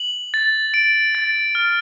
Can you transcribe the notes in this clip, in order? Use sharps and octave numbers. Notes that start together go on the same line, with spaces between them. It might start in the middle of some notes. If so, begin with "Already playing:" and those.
Already playing: F#7
A6
D7
A6
F6